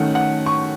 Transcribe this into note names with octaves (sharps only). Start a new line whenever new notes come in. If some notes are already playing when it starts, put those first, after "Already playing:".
Already playing: D#3 A3 C#4 F#5
F#5
C#6